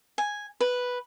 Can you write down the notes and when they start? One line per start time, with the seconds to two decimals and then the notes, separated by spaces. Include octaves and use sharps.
0.18 G#5
0.61 B4